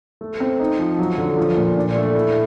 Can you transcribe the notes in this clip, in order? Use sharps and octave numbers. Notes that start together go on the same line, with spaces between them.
A3
C4
D#4
F3
F#3
D3
F3
A#2
D4
A3
E4